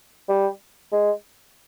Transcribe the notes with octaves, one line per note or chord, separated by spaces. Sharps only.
G3
G#3